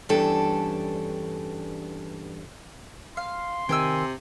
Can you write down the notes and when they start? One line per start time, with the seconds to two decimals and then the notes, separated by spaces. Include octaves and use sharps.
0.09 E2 G2 C#4 D4 G4 A4
3.17 F5 C6
3.69 C3 D#3 G5 G#5 E6